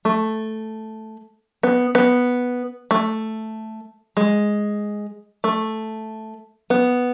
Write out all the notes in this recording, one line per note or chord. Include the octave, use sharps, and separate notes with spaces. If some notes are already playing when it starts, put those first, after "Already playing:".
A3
B3
B3
A3
G#3
A3
B3